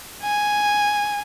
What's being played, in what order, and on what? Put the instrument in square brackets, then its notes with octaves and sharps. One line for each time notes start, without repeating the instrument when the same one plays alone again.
[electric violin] G#5